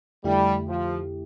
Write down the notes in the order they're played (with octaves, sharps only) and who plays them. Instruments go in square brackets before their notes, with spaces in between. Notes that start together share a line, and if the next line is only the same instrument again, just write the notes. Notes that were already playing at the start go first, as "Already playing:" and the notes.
[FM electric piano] F2 D3 A3 E4 G4 [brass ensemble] G3
[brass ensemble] F3